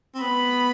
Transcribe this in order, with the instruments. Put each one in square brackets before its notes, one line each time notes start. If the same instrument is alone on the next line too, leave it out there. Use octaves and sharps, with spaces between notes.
[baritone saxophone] C4
[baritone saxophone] B3 [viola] B5